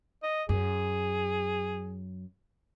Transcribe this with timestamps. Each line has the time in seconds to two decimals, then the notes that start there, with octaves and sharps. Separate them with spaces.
0.23 D#5
0.49 F#2 G#4